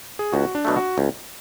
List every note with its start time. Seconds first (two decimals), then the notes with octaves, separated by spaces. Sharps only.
0.19 G#4
0.32 C#2 F#4
0.55 D4
0.65 B2 F#3 A3
0.76 F#4
0.98 C#2